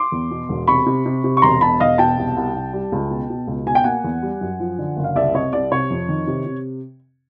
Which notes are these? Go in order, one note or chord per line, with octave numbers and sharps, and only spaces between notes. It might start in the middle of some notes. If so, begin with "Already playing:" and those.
Already playing: C6 D6
E2
B2
E1
C3 B5 C#6
C3
C3
C3
C#6
E1 A#5 C6
B2 A5 B5
E1 D#5 F5
B2 G5 A5
C2
C2
C2
G3
C#2
B2
B2
C#2
B2 G#5
G5
A#3 F#5 G#5
E2
G3
F#2
F3
D3
F#1
F5
C2 D5 E5
C3 C#5 D#5
C2 D5
C3 C#5
F2
D#3
C3
C3